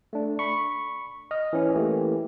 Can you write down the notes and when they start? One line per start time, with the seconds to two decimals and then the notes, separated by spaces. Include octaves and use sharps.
0.13 A3 D4
0.39 B5 C#6
1.31 D#5 D#6 F6
1.53 E3 C#4 E4
1.75 E3 A3 A#3 G4